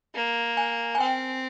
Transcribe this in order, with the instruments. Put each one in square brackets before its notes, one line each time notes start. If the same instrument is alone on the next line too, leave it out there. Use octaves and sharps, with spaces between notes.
[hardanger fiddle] A#3
[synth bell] G#5
G#5
[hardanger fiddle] C4 [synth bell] G5